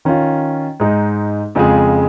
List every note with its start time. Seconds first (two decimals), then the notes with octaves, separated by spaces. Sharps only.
0.05 D#3 C#4 F4
0.80 G#2 G#3 D#4
1.55 F2 C#3 G#3 F4 G#4